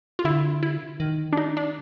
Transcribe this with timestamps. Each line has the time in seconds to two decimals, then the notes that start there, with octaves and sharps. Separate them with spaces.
0.19 F4
0.25 D3 E4
0.63 E4
1.00 D#3
1.33 D4
1.37 D#4
1.57 D4